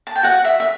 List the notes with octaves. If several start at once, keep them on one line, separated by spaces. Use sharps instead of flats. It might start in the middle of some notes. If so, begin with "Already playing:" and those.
A5
G5
F#4 F#5
E5
E5